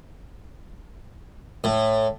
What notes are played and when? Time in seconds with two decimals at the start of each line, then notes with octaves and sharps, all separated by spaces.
1.64 A2